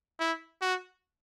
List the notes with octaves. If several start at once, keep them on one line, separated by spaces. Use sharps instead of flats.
E4
F#4